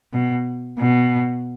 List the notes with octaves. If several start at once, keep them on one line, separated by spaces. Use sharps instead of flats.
B2
B2